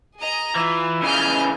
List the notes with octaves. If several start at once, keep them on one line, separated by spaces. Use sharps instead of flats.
G#4 D#5 A#5
E3 F4
C#3 E3 D#5 F6 G6